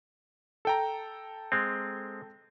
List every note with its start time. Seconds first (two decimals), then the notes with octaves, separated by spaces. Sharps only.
0.65 A4 G5 A#5
1.52 G#3 C4